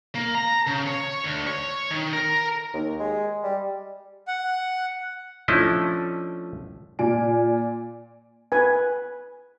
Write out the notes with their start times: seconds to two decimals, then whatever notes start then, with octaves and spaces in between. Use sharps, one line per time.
0.15 A#3
0.35 A#5
0.67 C#3
0.87 C#5
1.24 D2
1.47 C#5
1.91 D#3
2.13 A#4
2.74 D#2
3.00 G#3
3.44 G3
4.28 F#5
5.48 F3 A3 C#4 D4 E4 D#5
6.99 A#2 D5 G#5 D7
8.52 B4 G#5